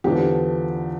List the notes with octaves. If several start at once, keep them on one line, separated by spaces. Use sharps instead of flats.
E2 D3 F3 G4